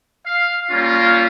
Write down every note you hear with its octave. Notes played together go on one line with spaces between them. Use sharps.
F5
G3 A#3 C#4 F4